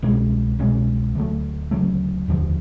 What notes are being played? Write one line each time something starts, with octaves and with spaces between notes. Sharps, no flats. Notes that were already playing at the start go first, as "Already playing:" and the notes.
C2 B2 G#3 C#4
C2 B2 G#3 C#4
D2 C#3 F#3 A3
D2 C#3 F#3 A3
F1 D#2 D3 F3